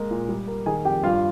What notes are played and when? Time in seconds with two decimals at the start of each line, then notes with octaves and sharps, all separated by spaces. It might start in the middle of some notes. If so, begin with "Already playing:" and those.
Already playing: G#3 A#3
0.11 A#2
0.29 G3
0.47 A#3
0.66 D#3 G#4 G#5
0.85 F2 G4 G5
1.03 G2 F4 F5